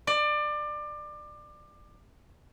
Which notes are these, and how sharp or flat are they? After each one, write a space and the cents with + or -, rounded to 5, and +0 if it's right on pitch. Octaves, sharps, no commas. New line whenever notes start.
D5 +25